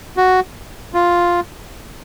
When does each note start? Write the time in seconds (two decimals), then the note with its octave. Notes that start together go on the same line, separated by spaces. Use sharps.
0.17 F#4
0.94 F4